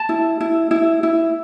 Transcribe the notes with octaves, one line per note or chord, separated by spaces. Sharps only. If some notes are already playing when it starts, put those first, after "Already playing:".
Already playing: A5
E4
E4
E4
E4